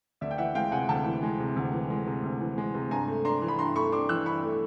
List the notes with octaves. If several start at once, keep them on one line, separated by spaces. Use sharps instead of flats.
D2 D5 E5
G5
E3 E5 F#5
G#3 F5 G5
C3 F#5 G#5
D2 G5 A5
E3
G#3
C3
D2
E3
G#3
C3
D2
E3
G#3
C3
G2 G#5 A#5
A3
D4 A#5 C6
E3
B5
G2 A#5 C6
A3 B5 C#6
D4 C6 D6
E3 E6 F#6
G2 B5 C#6
A3